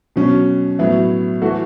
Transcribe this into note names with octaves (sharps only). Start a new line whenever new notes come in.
B2 F#3 C#4
A2 F#3 B3 E4
E3 A3 F#4